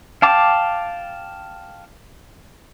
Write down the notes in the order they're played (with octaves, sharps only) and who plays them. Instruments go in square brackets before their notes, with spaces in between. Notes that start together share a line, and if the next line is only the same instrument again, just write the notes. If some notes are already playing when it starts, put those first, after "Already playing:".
[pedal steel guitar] F5 G5 A5 D6